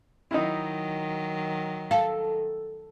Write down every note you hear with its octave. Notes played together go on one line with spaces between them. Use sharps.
D#3 F#3 D#4 E4
A4 F5